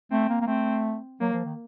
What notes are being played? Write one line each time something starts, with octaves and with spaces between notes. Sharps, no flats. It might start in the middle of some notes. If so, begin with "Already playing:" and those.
A3 C4
A#3
A#3
A3 C4
F#3 A#3
F3
D#3